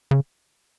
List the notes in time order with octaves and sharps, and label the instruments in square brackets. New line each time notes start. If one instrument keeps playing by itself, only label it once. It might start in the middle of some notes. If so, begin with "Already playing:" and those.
[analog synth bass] C#3